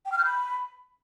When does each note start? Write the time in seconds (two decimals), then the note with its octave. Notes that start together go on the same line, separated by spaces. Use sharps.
0.05 G5
0.12 F6
0.18 G6
0.25 B5